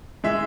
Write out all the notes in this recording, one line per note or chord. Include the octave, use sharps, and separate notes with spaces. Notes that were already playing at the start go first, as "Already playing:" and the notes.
E3 G#3 E5